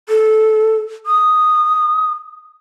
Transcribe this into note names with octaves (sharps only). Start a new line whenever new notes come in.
A4
D#6